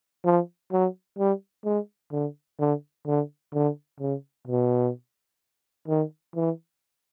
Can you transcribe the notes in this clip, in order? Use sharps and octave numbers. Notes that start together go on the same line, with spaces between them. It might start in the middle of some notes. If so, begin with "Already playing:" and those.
F3
F#3
G3
G#3
D3
D3
D3
D3
C#3
B2
D#3
E3